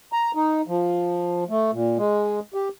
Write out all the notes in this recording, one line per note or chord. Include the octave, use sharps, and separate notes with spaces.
A#5
D#4
F3
A3
A#2
G#3
G4